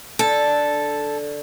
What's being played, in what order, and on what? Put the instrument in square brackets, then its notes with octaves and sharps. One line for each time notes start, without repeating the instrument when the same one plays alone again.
[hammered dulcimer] D3 [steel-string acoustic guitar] A4